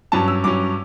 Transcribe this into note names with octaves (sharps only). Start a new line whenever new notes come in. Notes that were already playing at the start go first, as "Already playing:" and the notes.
G2 F#3 C#4 A5
E6
G2 F#3 C#4 D6